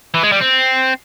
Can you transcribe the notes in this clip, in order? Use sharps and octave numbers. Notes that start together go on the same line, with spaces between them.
E3
G#3
G3
C4